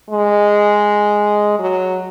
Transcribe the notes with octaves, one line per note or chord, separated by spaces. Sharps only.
G#3
F#3